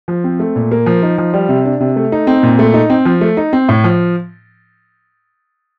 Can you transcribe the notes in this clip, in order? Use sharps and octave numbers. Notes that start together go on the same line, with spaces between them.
F3
C4
A3
A#2
A#3
F3
D#4
F3
G3
C3
D4
C3
A3
D#4
C4
A#2
A3
D#4
C4
F3
A3
D#4
C4
A2
F3